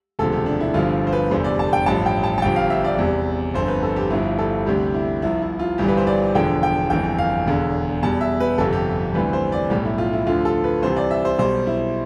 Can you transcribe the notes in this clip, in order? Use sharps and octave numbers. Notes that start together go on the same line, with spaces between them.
E1 D2 C3 F3 A4
G4
D4
E4
G1 G2 D3 F3 F4
C5
B4
F1 E2 D3 G3 C5
D5
A5
G5
A1 G2 F3 A5
G5
A5
A5
G1 G2 F3 G5
F5
E5
D5
E2 C3 G3
G1 F2 D3 C5
B4
A4
G4
G1 G2 F3 E4
A4
D2 C3 G3 G4
E4
C2 C3 F3 E4
E4
F4
G1 G2 E3 G3 G4
B4
C5
D5
E1 E2 D3 F3 G5
G5
G1 F2 E3 G5
F5
E1 E2 D3
E2 B2 G3 A5
E5
B4
G1 F2 C3 A4
G4
D2 C3 E3 G3 B4
C5
D5
B1 A2 G3 G4
E4
F4
E4
D2 D3 F3 F4
A4
B4
C2 C3 E3 C5
D5
E5
C5
B1 B2 G3 C5
E4